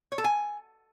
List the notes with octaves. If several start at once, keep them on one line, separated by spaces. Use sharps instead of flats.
C#5
A4
G#5